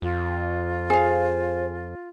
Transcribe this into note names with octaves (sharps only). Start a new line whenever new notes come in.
F2 F4
G#4 C5 F5